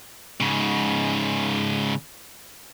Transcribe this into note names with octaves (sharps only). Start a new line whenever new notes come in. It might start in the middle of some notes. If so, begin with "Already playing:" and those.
G#2 C#3